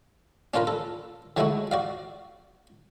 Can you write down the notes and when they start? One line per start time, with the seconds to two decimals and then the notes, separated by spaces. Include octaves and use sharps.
0.54 C#4 D4 F4 A#4 B4
0.67 A4
1.37 D3 F#3 G#3 A3 E4 F#4
1.71 F#4 D5 F5